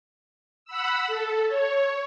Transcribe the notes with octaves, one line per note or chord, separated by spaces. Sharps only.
F#5 B5 E6
A4
C#5